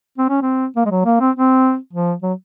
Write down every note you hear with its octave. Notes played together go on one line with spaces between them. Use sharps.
C4
C#4
C4
A#3
G#3
F#3
A#3
C4
C4
F3
F#3